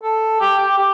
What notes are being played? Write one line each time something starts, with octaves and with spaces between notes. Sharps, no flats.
A4
G4
G4
G4